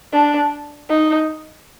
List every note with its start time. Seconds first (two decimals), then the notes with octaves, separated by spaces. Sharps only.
0.13 D4
0.90 D#4